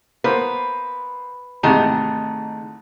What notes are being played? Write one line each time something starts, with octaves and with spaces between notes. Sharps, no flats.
A#3 B3 B4 C5
E2 G#2 C3 D#3 A3 A5 A#5